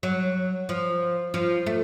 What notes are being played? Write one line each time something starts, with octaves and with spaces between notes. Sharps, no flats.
F#3
F3
F3
A3